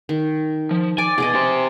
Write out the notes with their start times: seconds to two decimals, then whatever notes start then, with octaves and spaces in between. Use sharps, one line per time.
0.09 D#3
0.71 F3
0.98 D5 G#5 D6
1.18 B2 G#4 D5 D#5
1.34 G4 C5